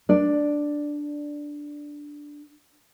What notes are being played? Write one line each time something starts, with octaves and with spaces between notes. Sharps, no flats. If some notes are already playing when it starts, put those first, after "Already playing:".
D4 D5